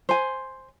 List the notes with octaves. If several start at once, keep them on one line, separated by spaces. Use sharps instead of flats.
C5 G#5